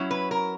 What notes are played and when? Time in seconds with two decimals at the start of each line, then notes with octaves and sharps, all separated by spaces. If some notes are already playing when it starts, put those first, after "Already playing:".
Already playing: F#3 C#4 E4
0.11 B4
0.31 A#4